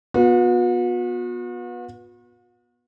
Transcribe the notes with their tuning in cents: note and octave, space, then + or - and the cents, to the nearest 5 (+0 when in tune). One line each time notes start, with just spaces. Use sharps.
B3 -15 F#4 -45